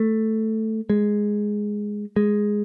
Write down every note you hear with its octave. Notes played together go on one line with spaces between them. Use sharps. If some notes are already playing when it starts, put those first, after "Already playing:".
Already playing: A3
G#3
G#3